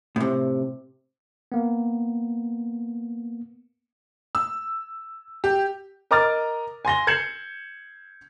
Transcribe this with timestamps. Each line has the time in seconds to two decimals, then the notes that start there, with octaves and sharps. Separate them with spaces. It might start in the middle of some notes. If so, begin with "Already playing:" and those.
0.16 A2 C3
1.52 A#3 B3
4.35 E6
5.44 G4
6.11 A#4 D#5 A#5 D6 F6 A6
6.85 G#5 C6 A#6 G7
7.07 G6 G#6 C7 C#7 E7 F#7